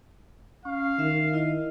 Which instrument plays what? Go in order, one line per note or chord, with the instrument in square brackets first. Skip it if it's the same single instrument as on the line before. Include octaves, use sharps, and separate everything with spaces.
[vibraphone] C#4 [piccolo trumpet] F5
[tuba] D#3 [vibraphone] E5
[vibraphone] E4 D#5